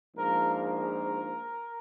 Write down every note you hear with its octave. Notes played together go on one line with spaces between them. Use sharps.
A#1 G#2 F3 A#3 A#4
A#4